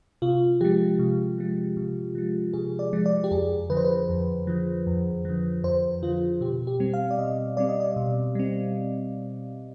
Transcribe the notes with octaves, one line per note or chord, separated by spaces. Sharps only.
C3 F4
F3 G#3 G4
C3
F3 G#3
C3
F3 G#3
C3 G#4
D5
F3 G#3
D5
G4
F2 G#4
D3 F3 B4
C5
B4
F2
D3 F3
F2
D3 F3
F2 C5
D3 F3 F4
B2 G4
G4
G3 C4
F5
D5
B2 D#5
G3 C4 D5
D#5
D5
B2
G3 C4